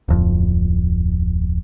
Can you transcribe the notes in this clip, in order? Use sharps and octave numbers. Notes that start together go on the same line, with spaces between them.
D1 F2